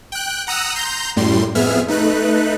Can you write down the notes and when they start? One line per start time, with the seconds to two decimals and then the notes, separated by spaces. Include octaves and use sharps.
0.12 G5 F#6
0.47 F#5 A#5 D#6 E6 F#6
0.75 A#5 C6 G6
1.16 F#2 A2 G3 C6
1.55 F2 B3 G#4 E5 F6
1.88 A3 D#4 B4 F#6